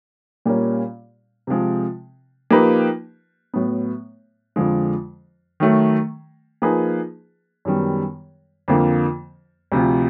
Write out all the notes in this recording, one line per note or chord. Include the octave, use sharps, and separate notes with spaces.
A#2 G3 A#3 C#4
C3 F3 G#3
F3 A#3 D#4 G4 B4
A2 F#3 B3
F2 D3 F3 G#3
D#3 F#3 A3
F3 A#3 D#4 G#4 B4
F#2 D#3 G3 B3
F2 D3 F3 A#3
D2 C3 F3